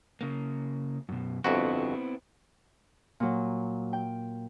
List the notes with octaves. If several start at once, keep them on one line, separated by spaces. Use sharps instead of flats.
C#3 A#3
F#2 B2
G1 F2 B3 C4 E4 F#4
A#2 F#3
G5